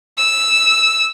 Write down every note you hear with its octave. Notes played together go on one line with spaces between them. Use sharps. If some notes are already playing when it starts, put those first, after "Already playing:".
E6